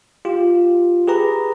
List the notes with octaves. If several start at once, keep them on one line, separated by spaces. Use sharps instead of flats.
F4 G4
G4 G#4 B4 A#5